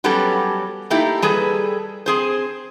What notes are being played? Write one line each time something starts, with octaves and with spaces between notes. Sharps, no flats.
F#3 G3 B3 C#4 G4 A4
A3 A#3 D#4 E4 G4
G3 G#4 A4 B4
C4 G#4 C5